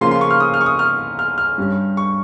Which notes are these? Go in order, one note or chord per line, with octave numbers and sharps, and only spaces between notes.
C#3 F3 A#3 F4 C6
C6
C#6
F6
D#6
F6
C#6
D#6
F6
F6
F6
G2 G3 C#4
C#6